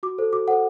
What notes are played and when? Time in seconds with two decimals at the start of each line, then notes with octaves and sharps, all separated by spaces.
0.03 F#4 D6
0.18 A4 C5
0.33 F#4 D6
0.47 A4 C5 F#5